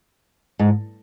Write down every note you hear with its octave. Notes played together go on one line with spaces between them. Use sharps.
G#2